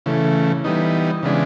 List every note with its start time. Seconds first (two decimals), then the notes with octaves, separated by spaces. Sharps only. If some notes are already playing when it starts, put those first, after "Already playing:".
0.06 C#3 E3 A3
0.64 E3 G3 B3 D#4
1.23 C#3 E3 G#3 B3 D4